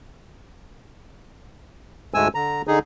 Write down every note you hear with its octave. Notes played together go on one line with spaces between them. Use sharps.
D2 G#2 G#3 A3 G#5 E6
D3 A#5
D3 D#4 G#4